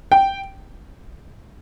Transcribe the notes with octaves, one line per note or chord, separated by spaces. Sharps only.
G5